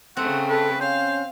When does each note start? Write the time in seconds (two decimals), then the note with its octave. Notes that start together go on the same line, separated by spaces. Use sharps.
0.17 C#3 A3 C4 F#5
0.49 A4 B4
0.80 C#4 C5 F5